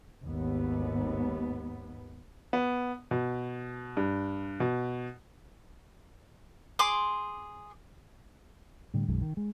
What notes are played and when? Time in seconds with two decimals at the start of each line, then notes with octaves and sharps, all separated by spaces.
0.24 G#1 D#2 B3
2.53 B3
3.11 B2
3.97 G2
4.60 B2
6.79 G#4 C6 D6
8.94 A2 D3 G3
9.08 B1 F#2 D#3 G#3
9.22 D#3
9.37 G#3